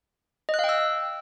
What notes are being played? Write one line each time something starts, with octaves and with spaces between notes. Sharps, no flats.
D#5
F#6
F5
G5
E6